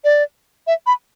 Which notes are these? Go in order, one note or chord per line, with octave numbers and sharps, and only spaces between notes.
D5
E5
B5